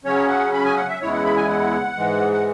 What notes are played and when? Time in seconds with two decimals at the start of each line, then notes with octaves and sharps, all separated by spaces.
0.05 C#3 F#3 C#4 C#5
0.28 F#5
0.53 B5
0.65 G#5
0.76 F#5
0.88 E5
1.01 E2 C#3 G#3 E4 C#5
1.13 F#5
1.25 B5
1.36 G#5
1.49 F#5
1.96 G#2 E3 G#3
2.32 F#5